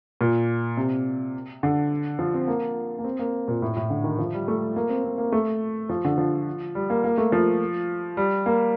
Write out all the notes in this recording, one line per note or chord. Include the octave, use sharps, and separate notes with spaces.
A#2
C3
D3
F3
C4
A#3
A#3
C4
A#3
A#2
A2
A2
D3
D#3
F3
G3
A3
A#3
C4
C4
A#3
A3
F3
D3
F3
G3
A#3
A#3
A3
F3
G3
A#3